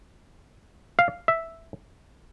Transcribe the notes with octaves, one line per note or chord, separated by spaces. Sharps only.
F5
E5